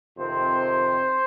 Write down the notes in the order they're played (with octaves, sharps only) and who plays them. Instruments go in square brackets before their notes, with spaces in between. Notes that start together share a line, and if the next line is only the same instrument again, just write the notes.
[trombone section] F2 C3 D#3 C4 C5